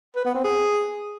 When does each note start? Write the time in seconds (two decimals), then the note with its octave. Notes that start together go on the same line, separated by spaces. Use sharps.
0.16 B4
0.25 B3
0.35 C4
0.44 G#4